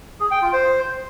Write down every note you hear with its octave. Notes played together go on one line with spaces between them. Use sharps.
G#4
G5
F4
C5